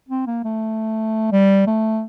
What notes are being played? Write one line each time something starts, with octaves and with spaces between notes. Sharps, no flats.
C4
A#3
A3
G3
A3